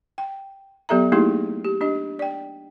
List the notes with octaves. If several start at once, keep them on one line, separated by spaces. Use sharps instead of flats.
G5
F#3 B3 G4 A4 E5 A#5
A3 A#3 D#4 E4 G4 G#4
G4
D4 G4 D#5
D5 G5